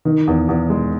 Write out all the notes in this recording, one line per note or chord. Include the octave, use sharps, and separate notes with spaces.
D#3
E2
E2
G#3